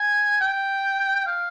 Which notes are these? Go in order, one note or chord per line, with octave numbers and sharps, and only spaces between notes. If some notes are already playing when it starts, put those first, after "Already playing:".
Already playing: G#5
G5
F5